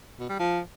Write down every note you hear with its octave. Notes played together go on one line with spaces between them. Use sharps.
B2
G3
F3